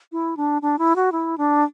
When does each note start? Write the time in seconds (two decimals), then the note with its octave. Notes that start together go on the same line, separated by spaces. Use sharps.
0.12 E4
0.37 D4
0.62 D4
0.79 E4
0.96 F#4
1.12 E4
1.38 D4